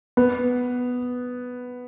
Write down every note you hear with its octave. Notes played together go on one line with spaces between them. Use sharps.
B3